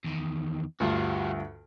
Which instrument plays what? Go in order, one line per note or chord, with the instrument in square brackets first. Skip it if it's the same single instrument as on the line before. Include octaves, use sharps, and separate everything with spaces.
[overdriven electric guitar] E2 D#3
[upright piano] D2 G2 F4 [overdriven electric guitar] G3 F#4